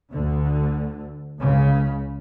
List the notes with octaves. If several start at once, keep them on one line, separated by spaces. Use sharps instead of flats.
D2 D3
C#2 C#3